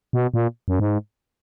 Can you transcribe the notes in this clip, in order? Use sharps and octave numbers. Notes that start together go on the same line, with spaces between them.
B2
A#2
F#2
G#2